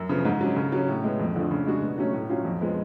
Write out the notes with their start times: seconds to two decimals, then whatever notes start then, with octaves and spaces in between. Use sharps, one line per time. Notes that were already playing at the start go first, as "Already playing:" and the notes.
Already playing: F#2
0.09 C#3 F3 B3
0.25 G#2
0.41 F#3 C#4
0.56 C#3
0.72 F#3 C#4
0.88 A2
1.04 G#3 B3
1.19 F2
1.35 D3 F3 A3
1.51 C#3
1.66 G#3 D4 F#4
1.82 B2
1.98 F#3 A3 C#4
2.14 A2
2.29 F#3 C#4 F4
2.45 F2
2.61 F3 G#3 B3